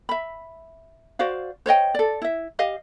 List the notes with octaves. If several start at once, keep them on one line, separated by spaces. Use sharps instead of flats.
E5 B5
F#4 C5 D5 F5
C5 C#5 D#5 G5
A4 D5
E4 E5
G4 D#5 F5